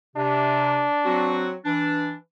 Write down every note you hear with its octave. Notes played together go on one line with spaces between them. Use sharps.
C3 D4
F#3 C4 F#4
E3 D4